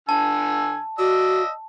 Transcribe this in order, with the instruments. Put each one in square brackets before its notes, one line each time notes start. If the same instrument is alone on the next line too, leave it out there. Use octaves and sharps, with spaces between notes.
[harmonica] D3 G#5 E6 [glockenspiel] A5
[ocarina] F#4 [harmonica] D5 D#5 E6